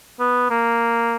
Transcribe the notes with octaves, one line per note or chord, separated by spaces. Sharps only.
B3
A#3